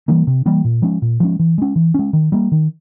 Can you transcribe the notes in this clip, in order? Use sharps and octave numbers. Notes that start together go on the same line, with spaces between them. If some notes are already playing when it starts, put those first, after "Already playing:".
E3 G3 A#3
C3
E3 G3 A#3
A#2
F3 G#3 C#4
A#2
F3 G#3 C#4
E3
G#3 C#4
E3
G#3 C#4
D#3
G3 A#3
D#3